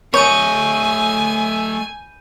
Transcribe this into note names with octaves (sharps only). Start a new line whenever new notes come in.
A3 C#5 D#5 G#5 B5 G6 D#7